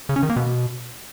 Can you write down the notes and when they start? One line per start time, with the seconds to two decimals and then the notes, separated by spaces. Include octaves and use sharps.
0.09 C#3
0.16 C#4
0.23 D#3
0.30 A#3
0.36 B2